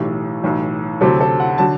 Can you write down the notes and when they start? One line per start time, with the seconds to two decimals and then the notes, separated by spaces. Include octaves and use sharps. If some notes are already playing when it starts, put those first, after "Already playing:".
Already playing: B1 A2 E3 G4
0.43 B1 A2 E3
1.01 D2 C3 F#3 A4
1.20 A4
1.40 F#5
1.58 D3 F#3 A5